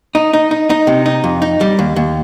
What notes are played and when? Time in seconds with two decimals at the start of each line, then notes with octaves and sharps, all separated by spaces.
0.15 D#4
0.33 D#4
0.51 D#4
0.70 D#4
0.87 C3
1.06 D#4
1.24 F2
1.42 D#4
1.61 G3
1.79 D#2
1.96 D#2